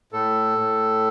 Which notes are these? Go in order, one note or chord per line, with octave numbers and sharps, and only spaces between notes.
A2 A4
A2